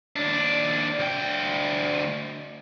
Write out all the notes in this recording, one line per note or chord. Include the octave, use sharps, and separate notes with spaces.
D#2 D4
D2 G5